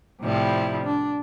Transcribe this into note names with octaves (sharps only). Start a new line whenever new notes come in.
A2 C3 F3 G3 E4
D4